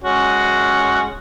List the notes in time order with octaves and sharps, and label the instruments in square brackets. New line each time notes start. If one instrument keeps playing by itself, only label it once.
[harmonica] G#3 C#4 F#4